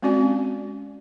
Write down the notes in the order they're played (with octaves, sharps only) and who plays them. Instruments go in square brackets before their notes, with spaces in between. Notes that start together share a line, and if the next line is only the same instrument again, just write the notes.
[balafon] G#3 C4 C#4 F#4 D5 G#5